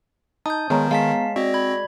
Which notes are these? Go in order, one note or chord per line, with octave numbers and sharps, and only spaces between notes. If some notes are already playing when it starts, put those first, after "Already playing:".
D#4 A5 D#6 G6
D#3 G#3 B3 C#5 A#5
G#3 F5 A5 B6
C4 F#4 D5 D#5
B5 G#6